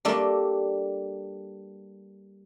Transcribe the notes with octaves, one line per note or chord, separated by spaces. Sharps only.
G3 A3 A#3 D4